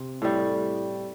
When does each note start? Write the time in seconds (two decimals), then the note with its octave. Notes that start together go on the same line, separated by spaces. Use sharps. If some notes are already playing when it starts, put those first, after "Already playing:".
Already playing: C3
0.22 A2 G3